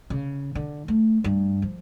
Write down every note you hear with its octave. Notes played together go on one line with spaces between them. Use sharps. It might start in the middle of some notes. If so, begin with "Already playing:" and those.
C#3
D3
A3
G2
F3